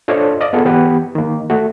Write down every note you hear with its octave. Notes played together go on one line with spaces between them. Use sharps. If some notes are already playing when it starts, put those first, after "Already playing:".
D4 F4 A4 C5 C#5 D#5
D5 D#5 F5
B3 F4 G#4 A4
E3 B3 G4 B4
D#3 A#3
A3 F#4